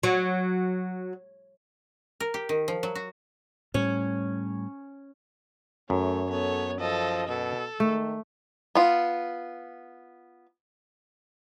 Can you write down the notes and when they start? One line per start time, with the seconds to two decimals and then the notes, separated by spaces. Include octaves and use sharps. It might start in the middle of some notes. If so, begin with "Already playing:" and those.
0.04 F#3
2.20 A#4
2.34 G4
2.49 D#3
2.68 F3
2.83 F#3
2.95 F#4
3.74 A2 G3 C#4
5.90 F#2 A3 C#5
6.30 B3 A4 C#5
6.80 F3 A4 D#5
7.29 B2 A4
7.80 D#3 A3
8.75 B3 F4